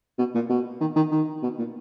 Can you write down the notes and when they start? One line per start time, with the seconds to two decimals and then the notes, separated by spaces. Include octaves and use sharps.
0.18 B2
0.35 A#2
0.50 B2
0.80 D#3
0.96 D#3
1.11 D#3
1.43 B2
1.58 A#2